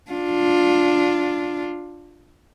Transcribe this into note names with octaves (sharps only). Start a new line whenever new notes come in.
D4 F4